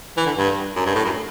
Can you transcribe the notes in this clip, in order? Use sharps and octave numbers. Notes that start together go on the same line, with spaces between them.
E3
D3
G2
F#2
G2
A2
F#2